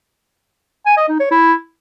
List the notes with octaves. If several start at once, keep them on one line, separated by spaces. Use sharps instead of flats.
G#5
D#5
D#4
C#5
E4